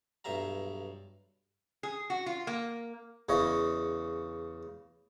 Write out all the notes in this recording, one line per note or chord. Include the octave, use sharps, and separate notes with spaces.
B1 G2 E5 F5 A#5
G#4
F#4
F4
A#3
E2 C#3 C#5 D#5